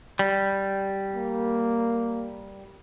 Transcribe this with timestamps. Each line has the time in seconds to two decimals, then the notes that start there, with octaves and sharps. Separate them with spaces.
0.19 G3
1.15 A#3